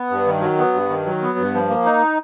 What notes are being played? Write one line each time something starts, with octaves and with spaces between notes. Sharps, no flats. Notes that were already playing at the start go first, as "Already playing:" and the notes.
Already playing: B3
G2
D#3
F#3
B3
G2
D#3
F#3
B3
G2
F3
A#3
D#4